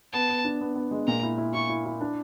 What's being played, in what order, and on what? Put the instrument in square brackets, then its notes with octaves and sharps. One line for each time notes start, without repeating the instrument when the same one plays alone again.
[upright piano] B3 [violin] A5
[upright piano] B3
D4
B3
B3
G#3
[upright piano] A#2 [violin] A#5
[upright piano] E4
E4
[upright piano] E4 [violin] C#6
[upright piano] E4
E4
D4